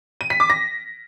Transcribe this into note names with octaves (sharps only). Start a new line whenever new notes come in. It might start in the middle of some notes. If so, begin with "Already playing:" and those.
D#7
B6
D6
A#6